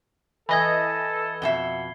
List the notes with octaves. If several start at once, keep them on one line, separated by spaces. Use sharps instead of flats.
E3 A4 D#5 B5 G#6
F2 B2 E5 F#5 C7 G7